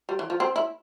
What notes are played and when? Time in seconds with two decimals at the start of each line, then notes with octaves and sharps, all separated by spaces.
0.09 G3
0.19 E3
0.30 F3
0.40 C4
0.56 E4